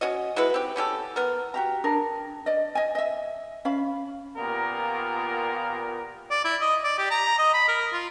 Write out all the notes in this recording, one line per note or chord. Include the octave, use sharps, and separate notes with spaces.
C#4 F#4 D#5
G#3 E4 F#4 B4
C4 G4
B3 C#4 G4 A4
B3 A#4
F#4 G4 A#5
D4 G#4 A#4
D5 D#5
D#5 G#5
D#5 E5
C#4 F5 B5
A#2 A#3 B3 F4 G4 A#4
D5
E4
D#5
D5
G4
A#5
D#5
B5
A#4
F4